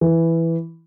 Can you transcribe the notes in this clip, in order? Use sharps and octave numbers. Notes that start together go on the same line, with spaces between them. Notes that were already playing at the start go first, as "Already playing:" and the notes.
E3